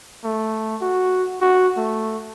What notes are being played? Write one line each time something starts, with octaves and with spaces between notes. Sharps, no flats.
A3
F#4
F#4
A3